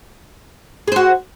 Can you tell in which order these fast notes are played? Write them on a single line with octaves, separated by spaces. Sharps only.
G#4 C5 F#4